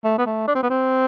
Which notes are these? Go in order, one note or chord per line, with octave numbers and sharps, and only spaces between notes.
A3
B3
A3
D4
C4
B3
C4